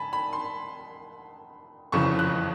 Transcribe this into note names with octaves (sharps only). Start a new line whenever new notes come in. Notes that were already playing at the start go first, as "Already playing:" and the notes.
Already playing: G#5 A5 B5
B5
C6
F#1 F2 C#3 E3 C#6
F#6